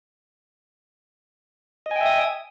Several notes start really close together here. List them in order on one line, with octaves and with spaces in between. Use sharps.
D#5 G#5 G5 E5 D#6